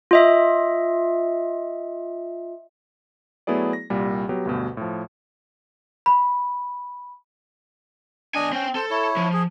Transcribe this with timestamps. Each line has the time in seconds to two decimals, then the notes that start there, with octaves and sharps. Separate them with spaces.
0.11 F4 D#5 E5
3.47 F#3 A3 B3 E4 G#4 D5
3.73 A#6
3.90 C2 A#2 G3
4.29 F#3 B3 G4
4.45 D2 G2 B2
4.77 A2 F3
6.06 B5
8.35 B1 D4 D#5 G#5
8.53 C4 C#4 G5
8.75 A4 C5
8.90 E4 C#5
9.17 F3
9.33 G#4